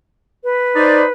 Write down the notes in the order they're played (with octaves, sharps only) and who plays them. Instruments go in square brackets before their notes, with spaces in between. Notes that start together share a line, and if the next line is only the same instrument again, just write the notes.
[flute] B4
[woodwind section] D#4 C5 D5